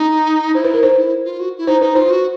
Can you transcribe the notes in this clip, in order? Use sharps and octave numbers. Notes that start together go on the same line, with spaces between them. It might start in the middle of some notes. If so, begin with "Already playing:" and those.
Already playing: D#4
E4 C5
B4
A#4
D#4 C5
E4
F4
F#4
E4
D#4 C5
D#4 B4
F4 C5
F#4